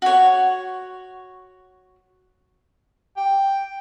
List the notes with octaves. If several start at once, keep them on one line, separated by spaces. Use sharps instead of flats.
F#4 C#5
G5